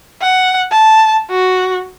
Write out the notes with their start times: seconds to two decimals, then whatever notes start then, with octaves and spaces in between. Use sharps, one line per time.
0.22 F#5
0.71 A5
1.30 F#4